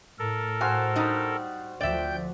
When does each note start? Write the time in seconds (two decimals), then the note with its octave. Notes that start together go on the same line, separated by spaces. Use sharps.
0.19 A2 A4 A#4
0.61 F#4 C5 F5 G#5
0.96 G3 D#4
1.81 D2 F3 D5 E5 G5 G6